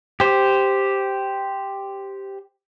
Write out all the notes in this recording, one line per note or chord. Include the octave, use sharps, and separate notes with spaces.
G4 C5